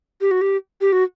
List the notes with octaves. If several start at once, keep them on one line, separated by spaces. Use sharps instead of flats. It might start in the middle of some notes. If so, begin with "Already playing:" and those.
G4
F#4
G4
G4
F#4